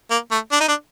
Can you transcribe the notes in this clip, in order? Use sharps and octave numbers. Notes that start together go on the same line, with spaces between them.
A#3
A3
D4
D#4
D4